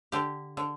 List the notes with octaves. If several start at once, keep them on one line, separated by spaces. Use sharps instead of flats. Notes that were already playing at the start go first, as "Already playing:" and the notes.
D3 G4
D3